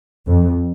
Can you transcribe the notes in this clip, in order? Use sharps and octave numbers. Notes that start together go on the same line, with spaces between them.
F2